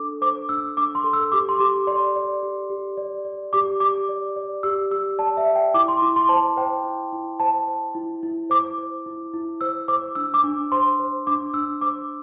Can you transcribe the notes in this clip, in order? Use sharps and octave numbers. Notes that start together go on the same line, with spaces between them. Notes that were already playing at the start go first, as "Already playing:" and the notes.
Already playing: D4 A4 D6
C5 D6
D4 E6
D4 D6
C6
A4
E6
G4 D6
C6
G4 D6
D5 C6
D5
G4
G4
D5
D5
G4 D6
G4 D6
D5
D5
G4 E6
G4 E6
D5 A5
E5
D5
G5
E4 D6
C6
E4 D6
C6
C5 A5
C5 G5
E4
E4
C5 A5
C5
E4
E4
C5 D6
C5
E4
E4
C5 E6
C5 D6
D4 E6
D6
D4
C5 C6
C5
D4 D6
D4 E6
C5 D6